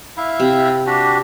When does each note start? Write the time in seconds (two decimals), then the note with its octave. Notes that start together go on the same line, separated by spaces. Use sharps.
0.17 E4 E5 F5
0.40 C3
0.87 D4 F#4 G4